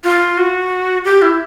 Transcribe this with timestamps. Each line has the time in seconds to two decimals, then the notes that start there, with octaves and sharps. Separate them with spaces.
0.04 F4
0.38 F#4
1.04 G4
1.22 E4